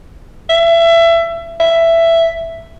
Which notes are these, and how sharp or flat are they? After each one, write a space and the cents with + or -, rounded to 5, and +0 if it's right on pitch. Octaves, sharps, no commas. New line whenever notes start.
E5 +25
E5 +10